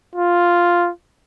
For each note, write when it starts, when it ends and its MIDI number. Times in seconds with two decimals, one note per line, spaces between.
0.15 0.90 65